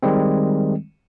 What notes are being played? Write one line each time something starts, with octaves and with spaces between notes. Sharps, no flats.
D#3 G3 G#3 C4